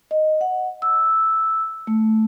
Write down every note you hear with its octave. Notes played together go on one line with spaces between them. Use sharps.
D#5
F#5
E6
A3